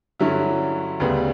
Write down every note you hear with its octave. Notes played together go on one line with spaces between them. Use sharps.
G2 D3 F#3 C#4 E4
D2 C#3 G3 B3